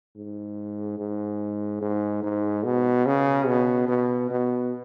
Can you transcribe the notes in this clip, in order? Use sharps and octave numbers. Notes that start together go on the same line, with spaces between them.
G#2
G#2
G#2
G#2
B2
C#3
B2
B2
B2